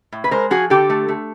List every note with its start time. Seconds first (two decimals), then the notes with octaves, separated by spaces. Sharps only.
0.12 A2
0.24 B4
0.31 G#3 A#4 C5
0.50 F3 F#4 G#4
0.70 D3 G4 A4
0.90 A3
1.08 A3